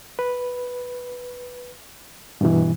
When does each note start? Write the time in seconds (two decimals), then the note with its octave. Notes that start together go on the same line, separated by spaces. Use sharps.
0.19 B4
2.41 G2 B2 E3